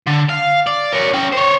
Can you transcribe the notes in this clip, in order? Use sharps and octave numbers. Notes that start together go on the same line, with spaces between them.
D3
F5
D5
A#4 C#5
C#4 G5
C5 C#5